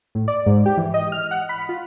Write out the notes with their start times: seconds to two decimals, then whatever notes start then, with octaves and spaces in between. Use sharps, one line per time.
0.15 A2
0.28 D5
0.46 G#2
0.66 G4
0.77 E3
0.94 D#5
1.12 F6
1.31 F#5
1.49 B5
1.69 F4